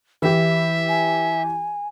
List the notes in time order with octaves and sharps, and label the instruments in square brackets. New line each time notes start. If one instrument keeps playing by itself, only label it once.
[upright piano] E3 G4 [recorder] E5
[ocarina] G#5